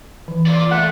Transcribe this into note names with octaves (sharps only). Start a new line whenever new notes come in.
E3
F4 D5
A3 F#5